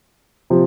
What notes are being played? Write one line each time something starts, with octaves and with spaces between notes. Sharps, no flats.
C3 F3